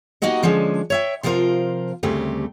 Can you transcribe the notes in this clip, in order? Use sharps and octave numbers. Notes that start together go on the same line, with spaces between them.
A#3 D#4 F#4 G4 D#5 F#5
D3 F3 G#3 C#4 D4
C#5 E5 G5
C3 F3 E4 F4 A#4 C5
D2 C#3 G3 A3 C4 G4